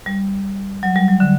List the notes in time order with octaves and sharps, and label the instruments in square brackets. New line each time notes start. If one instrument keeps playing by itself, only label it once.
[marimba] G3
F#3
G3
F#3
D3